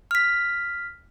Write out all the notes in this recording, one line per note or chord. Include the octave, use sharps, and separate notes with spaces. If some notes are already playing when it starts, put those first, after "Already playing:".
F6 B6